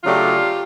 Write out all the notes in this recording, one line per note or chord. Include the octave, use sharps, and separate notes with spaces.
C#3 F#3 A3 D4 F4 G4